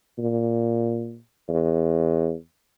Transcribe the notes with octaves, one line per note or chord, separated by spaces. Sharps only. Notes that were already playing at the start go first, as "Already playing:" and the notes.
A#2
E2